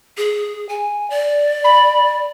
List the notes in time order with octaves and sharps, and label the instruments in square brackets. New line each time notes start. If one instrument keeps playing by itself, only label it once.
[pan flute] G#4
G#5
D5
[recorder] B5